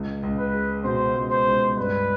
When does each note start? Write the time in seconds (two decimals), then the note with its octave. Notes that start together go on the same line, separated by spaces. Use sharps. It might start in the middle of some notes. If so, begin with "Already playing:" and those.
Already playing: C#2
0.23 C#2
0.38 B4
0.54 G#3
0.84 B2 C5
1.15 C#2
1.31 C5
1.46 C#2
1.77 G2 B4